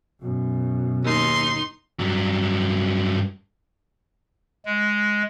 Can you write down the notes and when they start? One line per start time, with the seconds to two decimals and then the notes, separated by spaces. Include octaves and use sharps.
0.21 F#2 B2
1.04 D#2 D#4 C6
1.99 G2 F#3
4.65 G#3